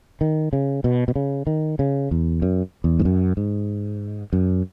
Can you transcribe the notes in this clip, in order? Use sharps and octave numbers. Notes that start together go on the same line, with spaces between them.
D#3
C#3
B2
B2
C#3
D#3
C#3
E2
F#2
E2
G#2
F#2
G#2
F#2